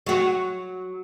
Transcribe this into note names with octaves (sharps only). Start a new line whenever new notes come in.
F#3 F#4